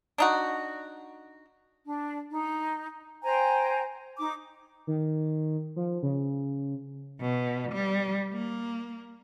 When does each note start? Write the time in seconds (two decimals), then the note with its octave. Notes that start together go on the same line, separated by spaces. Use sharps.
0.18 D4 D#4 F#4
1.85 D4
2.29 D#4
3.22 C5 G5 G#5 A#5
4.18 D#4 D6
4.87 D#3
5.76 F3
6.03 C#3
7.21 B2
7.73 G3
8.33 A#3